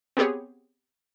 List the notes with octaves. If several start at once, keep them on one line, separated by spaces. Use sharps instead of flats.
B3 C4 G4 G#4 C#5